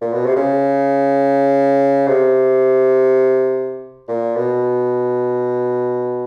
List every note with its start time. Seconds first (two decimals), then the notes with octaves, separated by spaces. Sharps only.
0.01 A#2
0.13 B2
0.26 C3
0.36 C#3
2.07 C3
4.08 A#2
4.36 B2